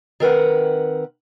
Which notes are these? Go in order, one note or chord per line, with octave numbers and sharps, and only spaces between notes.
D#3 C4 A#4 B4 F#5